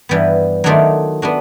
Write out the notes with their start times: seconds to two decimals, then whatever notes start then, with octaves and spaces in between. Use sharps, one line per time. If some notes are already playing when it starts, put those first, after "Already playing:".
0.09 G2 E3 G3 B3
0.64 D#3 F#3 A3 D4 F4
1.22 B3 D4 F#4